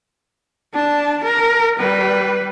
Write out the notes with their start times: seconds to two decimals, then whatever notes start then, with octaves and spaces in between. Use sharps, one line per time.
0.74 D4 A5
1.24 A#4
1.79 G3 B4